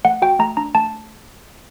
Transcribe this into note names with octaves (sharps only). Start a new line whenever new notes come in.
A3 F#5
F#4 G5
A3 A#5
D4 A#5
A3 A5